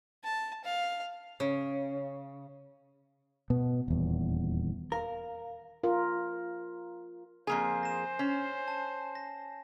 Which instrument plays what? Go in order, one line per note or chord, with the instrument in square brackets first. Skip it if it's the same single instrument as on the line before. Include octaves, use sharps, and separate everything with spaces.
[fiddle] A5
F5
[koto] C#3
[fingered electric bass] B2 B3
D#1 E2
[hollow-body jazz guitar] A#4 [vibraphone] F5
[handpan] F4 A#4
[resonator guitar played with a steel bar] F2 A#3 G#4 [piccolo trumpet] C5 [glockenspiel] G#5 C7
[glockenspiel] A#6 E7
[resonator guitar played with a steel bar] C#4 [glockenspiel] C7
[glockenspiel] A5
A#6